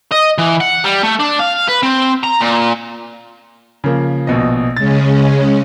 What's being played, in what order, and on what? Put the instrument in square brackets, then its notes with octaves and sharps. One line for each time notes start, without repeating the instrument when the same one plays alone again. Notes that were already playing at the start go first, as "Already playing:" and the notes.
[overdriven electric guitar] D#5
E3
F#5
G3
A3
D4
F5
B4
C4
A#5
A#2
[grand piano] C#3 F3 A#3
A#1 B2 D#5
[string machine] C#3 G#3 C#4 [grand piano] A6